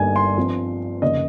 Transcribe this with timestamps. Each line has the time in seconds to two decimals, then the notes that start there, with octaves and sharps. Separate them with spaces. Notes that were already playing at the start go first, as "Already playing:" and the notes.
Already playing: G1 G2 G3 A#3 D#4 G#5
0.16 C6
0.37 G2 F3 C4
1.02 F1 D#2 C#3 D#5